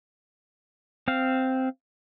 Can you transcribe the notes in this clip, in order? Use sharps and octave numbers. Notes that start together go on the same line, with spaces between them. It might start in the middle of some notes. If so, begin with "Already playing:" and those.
C4 F5